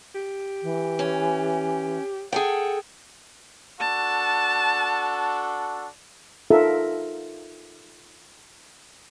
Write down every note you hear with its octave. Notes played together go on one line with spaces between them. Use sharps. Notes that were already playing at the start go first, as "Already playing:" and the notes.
G4
E3
C#4
G#4 A4 F#5 G5
D4 F#4 A4 A5
D#4 F4 A4 A#4 E5